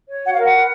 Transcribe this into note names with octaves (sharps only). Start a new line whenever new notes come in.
C#5
F#4 F#5
F5
A#4
F#5
B4